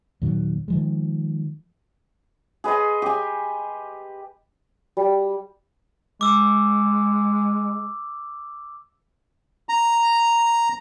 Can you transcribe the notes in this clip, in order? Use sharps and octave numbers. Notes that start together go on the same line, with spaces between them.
D#2 A#2 D#3 F#3
D#3 F3 G#3
G#4 B4 D#5 C6
G4 G#5
G3
G#3 D6 E6
A#5